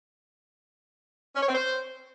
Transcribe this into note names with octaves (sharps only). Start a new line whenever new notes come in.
C#4
C#5
C4
C5